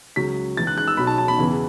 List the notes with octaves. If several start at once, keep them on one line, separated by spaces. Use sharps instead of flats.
C#2 C#3 F#3 B6
C#2 C#3 E3 A6
F#6
F#6
E6
B1 B2 F#3 B5
A5
A5
B5
E2 C#3 E3